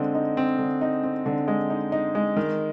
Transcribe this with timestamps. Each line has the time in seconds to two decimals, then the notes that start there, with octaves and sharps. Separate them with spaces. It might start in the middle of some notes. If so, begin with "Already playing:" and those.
Already playing: D3 G#3 C4
0.15 D#4
0.37 C4
0.59 D3
0.81 D#4
1.03 C4
1.26 D3
1.48 G#3
1.70 D#4
1.92 D#4
2.15 G#3
2.37 D#3